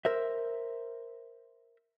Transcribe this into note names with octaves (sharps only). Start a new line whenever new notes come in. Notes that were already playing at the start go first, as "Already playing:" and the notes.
A#4 C5 E5